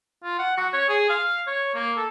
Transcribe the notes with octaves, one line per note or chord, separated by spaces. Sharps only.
F4
F#5
F#4
C#5
G#4
F5
C#5
A#3
A4